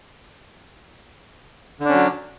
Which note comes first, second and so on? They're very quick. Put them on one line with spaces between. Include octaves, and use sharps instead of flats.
D3 D4 C#4 F#3